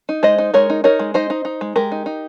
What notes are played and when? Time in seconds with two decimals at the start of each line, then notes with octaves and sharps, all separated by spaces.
0.09 D#4
0.23 G#3 C5 D#5
0.38 D#4
0.54 G#3 A#4 C#5
0.70 D#4
0.84 D#4 A#4 C#5
0.99 G#3
1.14 D#4 C5 D#5
1.30 D#4
1.45 D#4
1.61 G#3
1.76 G#3 G4 A#4
1.92 D#4
2.06 D#4